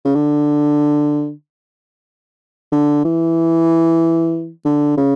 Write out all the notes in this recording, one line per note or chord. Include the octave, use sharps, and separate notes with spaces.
C#3
D3
D3
E3
D3
C#3